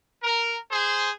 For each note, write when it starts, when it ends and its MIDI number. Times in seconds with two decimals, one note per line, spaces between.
0.23 0.57 70
0.71 1.11 68
0.71 1.11 72